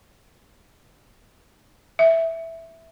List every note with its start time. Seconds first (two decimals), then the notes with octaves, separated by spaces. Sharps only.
1.99 E5